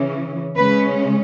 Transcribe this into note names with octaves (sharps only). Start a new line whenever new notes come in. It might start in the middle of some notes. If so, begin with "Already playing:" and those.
Already playing: C#3 E3 C#4
C#3 G#3 C#4 B4